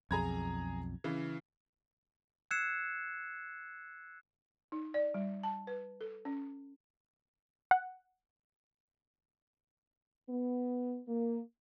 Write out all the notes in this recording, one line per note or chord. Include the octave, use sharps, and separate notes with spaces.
B1 F2 G#4 A#5 G#6
C#3 E3
E6 F#6 G#6 C7 C#7 E7
D#4
D5
G3
A5
B4
A4
C#4
F#5
B3
A#3